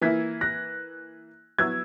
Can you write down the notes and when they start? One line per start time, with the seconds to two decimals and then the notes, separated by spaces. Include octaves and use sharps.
0.01 E3 A#3 E4 G#6 B6
0.41 F#6 A#6
1.59 F#3 B3 E4 E6 G#6